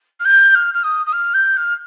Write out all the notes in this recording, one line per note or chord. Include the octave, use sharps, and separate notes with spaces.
F6
G6
F6
F6
D#6
D#6
F6
G6
F6